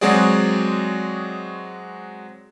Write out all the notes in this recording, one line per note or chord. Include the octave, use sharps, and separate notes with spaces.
F#3 G#3 C4 F#4 G#4 D5